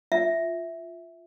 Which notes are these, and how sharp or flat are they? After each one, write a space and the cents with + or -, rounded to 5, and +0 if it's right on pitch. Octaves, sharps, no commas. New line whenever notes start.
F4 +0 E5 +0